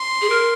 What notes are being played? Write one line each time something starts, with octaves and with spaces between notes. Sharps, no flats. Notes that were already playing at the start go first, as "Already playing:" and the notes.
Already playing: C6
G#4
A#4